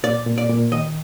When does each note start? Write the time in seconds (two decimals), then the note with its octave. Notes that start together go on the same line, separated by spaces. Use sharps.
0.03 A#2 D5
0.26 A#2
0.38 D5
0.49 A#2
0.72 D#3 D#5